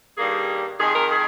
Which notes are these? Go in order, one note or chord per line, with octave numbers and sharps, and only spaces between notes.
G2 D#3 G3 A#3 G#4
F2 D#3 G#3 G#4
A#4
G#4